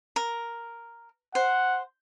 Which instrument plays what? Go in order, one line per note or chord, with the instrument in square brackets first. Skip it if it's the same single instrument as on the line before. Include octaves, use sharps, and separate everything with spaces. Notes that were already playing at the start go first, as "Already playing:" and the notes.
[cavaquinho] A#4
[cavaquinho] C5 [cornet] F#5